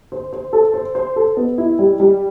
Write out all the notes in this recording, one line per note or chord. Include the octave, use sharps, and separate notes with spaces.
C5
C5
A4
C5
C5
A4
B3
E4
G3
G3